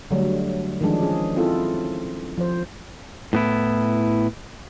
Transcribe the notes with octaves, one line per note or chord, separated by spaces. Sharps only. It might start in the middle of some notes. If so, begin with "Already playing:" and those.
D3 F#3 G3 A3
D#3 F3 G#3 D4 G#4
C#4 G#4
C4 E4 F4 A4
F3 C5
A2 B3 E4